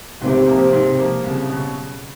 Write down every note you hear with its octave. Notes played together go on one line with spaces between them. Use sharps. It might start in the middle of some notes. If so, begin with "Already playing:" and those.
G#2 C3
F3 A#3
G#2
F3 A#3
C2 C#3
B2 F#3